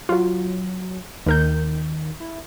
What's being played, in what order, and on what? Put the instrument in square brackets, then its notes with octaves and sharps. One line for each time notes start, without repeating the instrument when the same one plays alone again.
[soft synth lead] F#3 [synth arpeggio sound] F4 F#4
[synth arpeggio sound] D#2 A#4 G6 [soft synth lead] D#3
[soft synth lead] E4